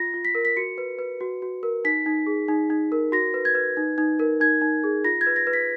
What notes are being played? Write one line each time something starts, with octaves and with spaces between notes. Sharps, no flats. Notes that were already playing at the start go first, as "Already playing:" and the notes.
Already playing: F4 A#6
F4
B6
A#4
B6
F#4 C#7
B4
B4
F#4
F#4
A#4
D#4 B6
D#4
G#4
D#4
D#4
A#4
F#4 A#6
B4
G#6
B4
D#4
D#4
A#4
D#4 G#6
D#4
G#4
F4 A#6
G#6
B4
A#6
B4
B6